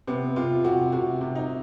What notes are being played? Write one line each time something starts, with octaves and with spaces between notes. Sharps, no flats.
C3 B3
C3 F4
C3 F#4
C3 F#4
C3
D#4